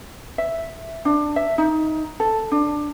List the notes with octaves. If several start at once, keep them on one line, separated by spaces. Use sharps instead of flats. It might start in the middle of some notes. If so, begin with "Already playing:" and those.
E5
D4
E5
D#4
A4
D4